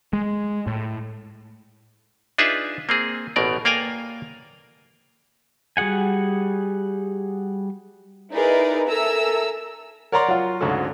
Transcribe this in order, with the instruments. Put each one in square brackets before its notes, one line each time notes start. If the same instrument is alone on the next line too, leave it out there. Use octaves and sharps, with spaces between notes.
[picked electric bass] G#3
A2
[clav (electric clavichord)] D4 D#4 F4 G#4 B4 E5
A#3 C4 G#4
A1 B2 A#4 D5
A#3 D5 F5 G5 G#5 A#5
[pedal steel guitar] G3 F#4 G#4 F#5 G#5
[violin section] D#4 E4 G#4 A#4 B4 D5
A4 A#4 E5 G#5 A#5 E6
[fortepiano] A#4 C#5 D5 F#5 A#5 C6
F#3 F4
D2 G#2 C#4 F#4 A4